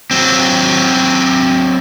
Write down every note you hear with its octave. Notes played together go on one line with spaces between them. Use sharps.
F#3 C4